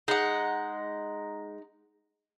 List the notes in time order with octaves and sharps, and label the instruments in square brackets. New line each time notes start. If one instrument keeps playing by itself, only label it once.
[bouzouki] G#3 [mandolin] D#4 F#5